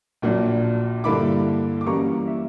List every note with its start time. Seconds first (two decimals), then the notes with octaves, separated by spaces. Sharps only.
0.22 A#1 A#2 F#3 A#3 D4
1.04 G2 D3 A#3 E4 B5 D6
1.81 D6
1.86 F#2 E3 G3 A#3 A#5 C#6
2.27 E5